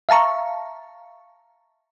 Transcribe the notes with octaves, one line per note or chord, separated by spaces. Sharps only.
E5 F5 A5 A#5 C#6